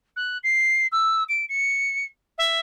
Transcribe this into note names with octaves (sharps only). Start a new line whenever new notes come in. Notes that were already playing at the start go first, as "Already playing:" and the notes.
F#6
C7
E6
D7
C#7
E5